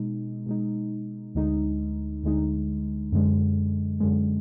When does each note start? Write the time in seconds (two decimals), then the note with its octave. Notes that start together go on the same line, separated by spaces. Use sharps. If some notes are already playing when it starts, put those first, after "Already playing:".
Already playing: B2 G#3 D#4
0.46 B2 G#3 D#4
1.35 D2 D3 G#3 D#4
2.23 D2 D3 G#3 D#4
3.12 F#2 D3 G#3
4.00 F#2 D3 G#3